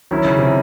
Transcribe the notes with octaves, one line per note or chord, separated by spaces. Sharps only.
D#3 F#3 C#4 E4
C#3
C3